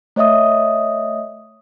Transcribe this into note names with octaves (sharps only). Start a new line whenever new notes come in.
A3 C#5 D#5 E5 D#6